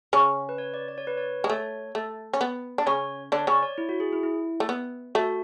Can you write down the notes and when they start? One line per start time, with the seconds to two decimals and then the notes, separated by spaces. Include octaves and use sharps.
0.13 C#3 C#4
0.49 B4
0.58 C#5
0.74 D5
0.88 D5
0.98 C#5
1.07 B4
1.17 C#5
1.44 G#3
1.49 A3 C#5
1.95 A3
2.33 C#4
2.41 B3
2.78 D4
2.86 C#3 C#4 C#5
3.32 D3 D4 C#5
3.47 C#3 C#4 D5
3.63 C#5
3.78 E4
3.89 F#4
4.00 G#4
4.13 E4
4.23 E4
4.60 A3
4.69 B3
5.15 A3 F#4